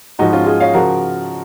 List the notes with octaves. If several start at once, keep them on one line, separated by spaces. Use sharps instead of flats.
G#2 F3 D#4 F#4
C#4 F4
F4 G#4
C#5 F5
C#3 F3 F#4 A#4